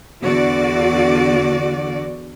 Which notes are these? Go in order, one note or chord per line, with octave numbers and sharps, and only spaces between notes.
E2 D3 F#4 D5